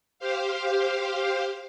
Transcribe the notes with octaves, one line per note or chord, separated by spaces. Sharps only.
G4 C5 F5